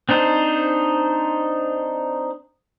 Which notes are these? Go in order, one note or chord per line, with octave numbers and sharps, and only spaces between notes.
C4 D4 D#4 C5